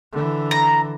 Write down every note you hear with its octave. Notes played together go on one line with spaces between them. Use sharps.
D3 E3
A#5